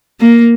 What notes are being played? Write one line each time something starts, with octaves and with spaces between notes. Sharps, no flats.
A#3